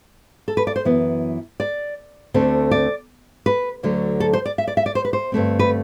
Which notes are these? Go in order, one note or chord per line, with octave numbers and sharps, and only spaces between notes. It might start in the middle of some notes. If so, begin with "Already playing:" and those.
A4
B4
D5
C5
F#2 E3 B3
D5
D2 D3 A3 C4
D5
B4
D2 D3 F#3 A3
A4
C5
D5
E5
D5
E5
D5
C5
B4
C5
G2 D3 A3 C4
B4